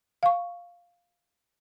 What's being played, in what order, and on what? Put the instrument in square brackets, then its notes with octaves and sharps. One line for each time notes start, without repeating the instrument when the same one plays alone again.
[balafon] F5 C#6